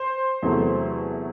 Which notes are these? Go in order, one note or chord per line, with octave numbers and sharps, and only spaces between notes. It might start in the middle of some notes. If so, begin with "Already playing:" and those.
Already playing: C5
E2 C3 F#3 A3